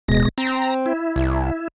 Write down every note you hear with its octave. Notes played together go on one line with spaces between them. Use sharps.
D1 B2 G#3 A#6
C4 A#5
E4
C2